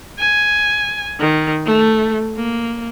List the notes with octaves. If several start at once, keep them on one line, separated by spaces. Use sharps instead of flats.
G#5
D#3
A3
A#3